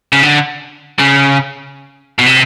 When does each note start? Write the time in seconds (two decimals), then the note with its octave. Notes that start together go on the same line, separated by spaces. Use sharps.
0.12 C#3
0.23 D3
0.99 C#3
2.19 B2
2.26 C3